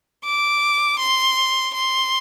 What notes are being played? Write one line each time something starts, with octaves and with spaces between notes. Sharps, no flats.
D6
C6
C6